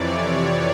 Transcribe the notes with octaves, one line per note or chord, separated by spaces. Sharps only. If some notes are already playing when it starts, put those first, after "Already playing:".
Already playing: F2 C3 E3 C#5 D5
C#5